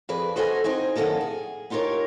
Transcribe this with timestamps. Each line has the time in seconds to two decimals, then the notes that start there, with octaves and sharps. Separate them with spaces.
0.09 F2 G#4 B4 D5
0.36 F#4 A4 C5 D#5 E5 G#5
0.64 C4 D#4 D#5 G#5
0.95 F#2 D#3 F3 A#3 A4 D#5
1.21 G#4
1.70 B3 D#4 F4 G4 A#4 C#5